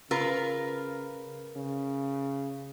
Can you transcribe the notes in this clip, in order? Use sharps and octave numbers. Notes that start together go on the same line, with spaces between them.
C#3 F4 A#4 B4
C#3